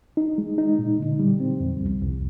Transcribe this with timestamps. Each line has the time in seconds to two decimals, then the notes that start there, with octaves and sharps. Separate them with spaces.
0.17 D#4
0.38 G#3
0.58 D#4
0.79 A#2
1.00 D3
1.19 G3
1.40 C4
1.60 F2
1.80 C2
2.01 C2